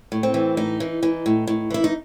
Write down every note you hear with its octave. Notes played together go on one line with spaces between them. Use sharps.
A2
C4
E3
A2 D#4
E3
E3
A2
A2
E3 E4
D#4